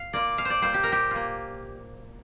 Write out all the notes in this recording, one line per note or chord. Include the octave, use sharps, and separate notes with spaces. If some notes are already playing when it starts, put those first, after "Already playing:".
Already playing: F5
A#3 F4 D5
A#2 F5
C5 D5
G3 A#3 F4 C5
G4
A#2 A#4
G4
A#3 F4